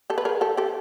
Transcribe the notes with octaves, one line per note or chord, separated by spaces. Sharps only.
G4 A4
B4
G#4 A#4
G4 A4
G4 A4